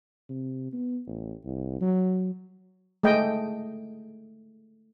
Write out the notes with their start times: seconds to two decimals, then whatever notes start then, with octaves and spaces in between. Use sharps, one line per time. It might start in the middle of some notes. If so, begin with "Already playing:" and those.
0.29 C3
0.73 B3
1.07 A1
1.45 C2
1.81 F#3
3.03 G#3 A3 D#5 G5